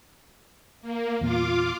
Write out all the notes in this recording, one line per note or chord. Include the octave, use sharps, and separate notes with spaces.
A#3
E2 A#2 F4 F5 D6